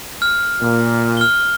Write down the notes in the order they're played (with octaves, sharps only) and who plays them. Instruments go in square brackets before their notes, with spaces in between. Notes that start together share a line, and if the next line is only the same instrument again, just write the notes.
[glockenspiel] F6
[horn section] A#2
[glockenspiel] F6 G7